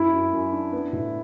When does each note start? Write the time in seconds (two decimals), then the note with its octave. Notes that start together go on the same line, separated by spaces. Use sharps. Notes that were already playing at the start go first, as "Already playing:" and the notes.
Already playing: F#2 E4
0.13 F#2
0.33 F#2
0.53 D4
0.73 B3
0.93 A2